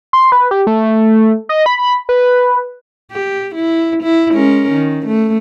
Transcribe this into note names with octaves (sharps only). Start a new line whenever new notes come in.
C6
B4
G4
A3
D#5
B5
B4
G4
E4
E4
G#3 C#4 A#4
D#3
A3